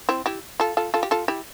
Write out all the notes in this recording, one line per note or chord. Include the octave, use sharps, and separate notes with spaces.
C4 E4
E4 G4
F4 A4
F4 A4
F4 A4
G4
F4 A4
E4 G4